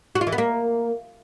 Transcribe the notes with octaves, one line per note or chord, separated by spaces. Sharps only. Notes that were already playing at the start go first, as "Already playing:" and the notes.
F#4
F4
E3
B3
A#3